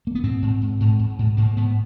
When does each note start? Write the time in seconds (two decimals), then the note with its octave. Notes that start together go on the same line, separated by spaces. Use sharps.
0.07 A#3
0.15 B3
0.23 G#2 C4
0.42 G#2
0.61 G#2
0.80 G#2
0.99 G#2
1.19 G#2
1.37 G#2 A#3
1.56 G#2 B3